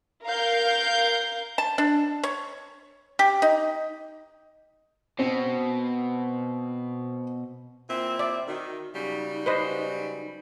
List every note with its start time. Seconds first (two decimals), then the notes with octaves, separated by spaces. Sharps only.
0.24 A#4 F5 G6
1.58 A5
1.78 D4
2.23 C#5
3.19 G4
3.42 D#4
5.19 B2 C4
7.89 A#2 C4 E4
8.19 D5 E5
8.48 D#3 F#4
8.95 C#3 F#3 G3 D#4
9.46 B4 C5 D#5